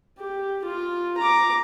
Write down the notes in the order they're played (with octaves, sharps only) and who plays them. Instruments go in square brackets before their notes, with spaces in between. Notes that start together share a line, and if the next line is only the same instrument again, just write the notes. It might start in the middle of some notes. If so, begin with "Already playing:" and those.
[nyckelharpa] G4
F4
A#5 D6